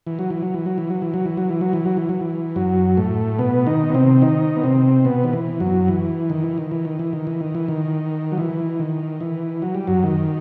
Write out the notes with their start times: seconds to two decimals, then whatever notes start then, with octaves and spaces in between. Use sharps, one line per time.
0.07 E3
0.19 F#3
0.30 E3
0.43 F#3
0.54 E3
0.66 F#3
0.78 E3
0.90 F#3
1.02 E3
1.14 F#3
1.25 E3
1.37 F#3
1.49 E3
1.61 F#3
1.73 E3
1.86 F#3
1.97 E3
2.09 F#3
2.21 E3
2.56 F#2 F#3
2.97 A2 A3
3.39 B2 B3
3.67 D#3 D#4
3.90 B3
3.94 C3 C4
4.22 D#3 D#4
4.56 B3
4.63 C3 C4
5.05 B2 B3
5.24 D#3
5.33 E3
5.60 F#2 F#3
5.88 E3
6.30 D#3
6.44 E3
6.58 D#3
6.71 E3
6.85 D#3
6.99 E3
7.13 D#3
7.27 E3
7.41 D#3
7.55 E3
7.68 D#3
8.32 F#3
8.38 E3
8.79 D#3
9.21 E3
9.62 F#3
9.75 G3
9.87 F#2 F#3
10.03 D#3